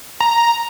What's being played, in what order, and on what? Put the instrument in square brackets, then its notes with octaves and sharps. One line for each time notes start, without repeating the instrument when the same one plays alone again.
[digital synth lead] A#5